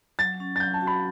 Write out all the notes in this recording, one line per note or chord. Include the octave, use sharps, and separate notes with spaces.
F#3 A6
C#4
A6
F#3 G6
A5
F#4
B5